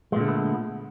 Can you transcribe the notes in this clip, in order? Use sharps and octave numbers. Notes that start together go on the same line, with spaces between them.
A#2 D3 G#3 A3 B3